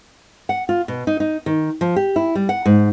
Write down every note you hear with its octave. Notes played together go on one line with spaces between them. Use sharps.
F#5
F4
B2
D#4
D#4
D#3
F3
G4
E4
G3
F#5
G#2